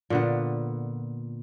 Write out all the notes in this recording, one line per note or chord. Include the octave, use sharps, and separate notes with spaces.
A#2 D3 B3